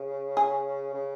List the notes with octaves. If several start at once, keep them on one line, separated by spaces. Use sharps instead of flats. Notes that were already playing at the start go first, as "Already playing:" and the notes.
Already playing: C#3
G#4
C#3